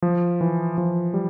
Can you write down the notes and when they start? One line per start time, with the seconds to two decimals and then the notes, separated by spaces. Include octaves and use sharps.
0.02 F3
0.41 E3
0.78 F3
1.14 G3